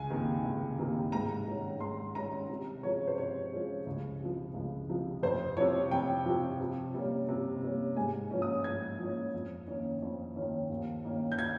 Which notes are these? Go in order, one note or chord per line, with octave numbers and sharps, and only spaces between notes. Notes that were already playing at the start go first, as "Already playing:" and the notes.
Already playing: C#2 G#5
C3 D#3 A#3
C#2
C3 D#3 A#3
G#2 A#5
D#3 G3 C#4
G#2 C6
D#3 G3 C#4 A#5
C3
F3 G#3 C#4 C#5
C5
C3 C#5
F3 G#3 C#4
C#2
C3 F3
C#2
C3 F3
F2 C5
C3 F3 C#5
F2 G5
C3 F3
C3
G3 A#3 C#4
C3
G3 A#3 C#4
G#2 G#5
F3 A#3 C#4
D#6
G#2 G#6
F3 A#3 C#4
F2
D#3 A#3 C#4
F2
D#3 A#3 C#4
D#2
D#3 A#3 C#4
G6
G#6